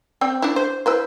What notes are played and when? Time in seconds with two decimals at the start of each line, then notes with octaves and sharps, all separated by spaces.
0.21 C4 D5 G5
0.42 D4 E4
0.56 C5
0.86 E4 B4 C5